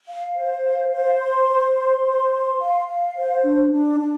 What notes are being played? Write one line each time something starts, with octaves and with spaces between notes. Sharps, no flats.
F5
C5
F5
C5
C6
C5
C6
C5
C6
F5
F5
C5
D4
D4
D4